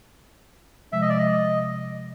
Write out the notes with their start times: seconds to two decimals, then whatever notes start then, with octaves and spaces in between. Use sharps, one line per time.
0.92 C3 F3 G#3 E5
1.01 D#5
1.10 D5
1.18 D#5